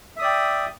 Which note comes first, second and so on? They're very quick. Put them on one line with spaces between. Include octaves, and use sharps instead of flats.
E5 D#6 D5 G5